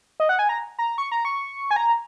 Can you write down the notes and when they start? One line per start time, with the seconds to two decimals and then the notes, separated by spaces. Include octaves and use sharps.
0.20 D#5
0.29 F#5
0.39 G#5
0.49 A#5
0.79 A#5
0.98 C#6
1.12 A#5
1.25 C#6
1.71 G#5
1.76 A#5